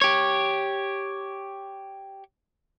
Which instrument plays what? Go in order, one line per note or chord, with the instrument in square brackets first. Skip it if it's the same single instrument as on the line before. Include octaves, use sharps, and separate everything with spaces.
[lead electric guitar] G4 C#5